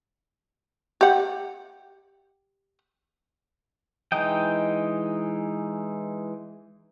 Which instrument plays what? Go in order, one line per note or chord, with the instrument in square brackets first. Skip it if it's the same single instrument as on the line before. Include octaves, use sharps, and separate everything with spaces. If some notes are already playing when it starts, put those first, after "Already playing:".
[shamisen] G4 F#5
[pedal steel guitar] E3 G#3 D#4 D#5 G5